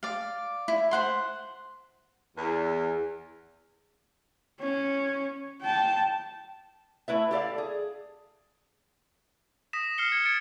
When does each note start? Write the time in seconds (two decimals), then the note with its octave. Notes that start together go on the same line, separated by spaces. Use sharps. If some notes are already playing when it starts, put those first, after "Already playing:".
0.03 D5 F5
0.68 E4
0.91 C5 F#5 C6
2.36 E2
4.60 C#4
5.62 G5 A5
7.08 A3 E4 B4 E5
7.31 G4 A4 D5 F5
7.58 G#4
9.73 D#6 A#6 B6 E7
9.98 F6 C7 C#7 G7
10.12 G#6 C#7
10.26 G#6 A6 C#7 D7